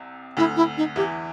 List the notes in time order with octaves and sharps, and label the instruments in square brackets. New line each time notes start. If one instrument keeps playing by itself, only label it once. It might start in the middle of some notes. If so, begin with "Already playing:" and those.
Already playing: [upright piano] C2 C3
[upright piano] D2 D3 [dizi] E4
[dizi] E4
D#4
[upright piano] E2 E3 [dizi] G4